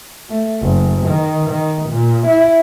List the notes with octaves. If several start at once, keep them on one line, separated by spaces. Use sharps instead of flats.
A3
F#1
D#3
D#3
A#2
E4